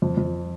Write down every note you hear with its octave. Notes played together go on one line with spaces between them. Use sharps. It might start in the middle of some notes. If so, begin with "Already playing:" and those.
F2
F2